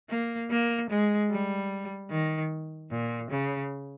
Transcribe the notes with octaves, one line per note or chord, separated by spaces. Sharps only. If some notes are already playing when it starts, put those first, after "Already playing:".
A#3
A#3
G#3
G3
D#3
A#2
C#3